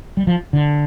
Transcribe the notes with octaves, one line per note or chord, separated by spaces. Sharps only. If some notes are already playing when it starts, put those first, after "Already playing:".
G3
F3
D3